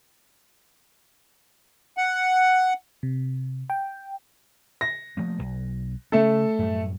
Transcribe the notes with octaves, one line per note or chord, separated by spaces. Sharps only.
F#5
C3
G5
A#6
F3 A3 A#3
D1 B1
C#3 A3 C#4 A4
F#2 A2 G3